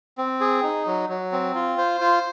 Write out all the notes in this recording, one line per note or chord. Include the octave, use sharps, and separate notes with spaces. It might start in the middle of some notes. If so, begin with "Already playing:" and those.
C4
G#4
D#4
F#3
F#3
C4
F4
C5
F4